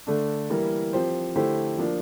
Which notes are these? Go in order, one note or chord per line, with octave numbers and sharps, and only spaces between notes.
D3 A3 D4
E3 G3 A#3 E4 A#4
F3 C4 G4 C5
D3 A3 E4 G4 C5
F3 A#3 D4